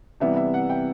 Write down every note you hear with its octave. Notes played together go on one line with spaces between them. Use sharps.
C3 E3 G3 B3 E5
E5
F#5
G5